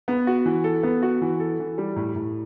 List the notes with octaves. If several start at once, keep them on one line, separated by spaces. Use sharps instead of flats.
B3
F#4
E3
A4
B3
F#4
E3
A4
E3
G3
A2
A2